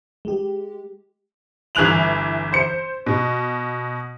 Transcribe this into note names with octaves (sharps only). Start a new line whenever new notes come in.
G#3 G4
G1 E3 G#5 F#6 F7 F#7
C5 C#7
B2